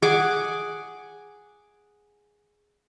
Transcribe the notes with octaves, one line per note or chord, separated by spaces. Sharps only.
G#4 F#5 G#5 D6